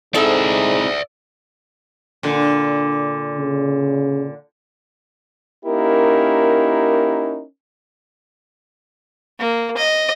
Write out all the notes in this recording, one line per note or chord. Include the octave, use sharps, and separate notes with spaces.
G#2 G#3 C4 E4 A4 D5 E5
A#2 D3
C#3
A#3 C#4 D#4 E4 G4 A#4
A#3
D#5